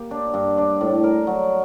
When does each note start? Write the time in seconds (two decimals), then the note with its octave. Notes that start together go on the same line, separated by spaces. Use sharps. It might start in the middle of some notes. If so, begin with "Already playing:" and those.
Already playing: A#3 G4
0.11 D4
0.34 G2
0.58 D4
0.81 A2
1.04 A#4
1.27 F#3